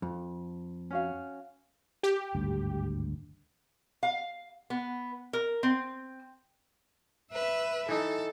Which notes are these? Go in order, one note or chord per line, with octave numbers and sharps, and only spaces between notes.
F2
C#4 F#4 F5
G4
G#1 D2 G2
F5
B3
A#4
C4
B4 E5
E3 D#4 A4